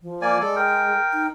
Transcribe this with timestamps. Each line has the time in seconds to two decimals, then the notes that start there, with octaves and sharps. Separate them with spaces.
0.01 F3
0.22 A#3 D5 G#5
0.40 G#3 A4 D5
0.56 A#4 G5
1.13 D#4